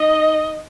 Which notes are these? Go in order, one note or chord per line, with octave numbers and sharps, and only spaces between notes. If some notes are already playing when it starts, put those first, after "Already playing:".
Already playing: D#4 D#5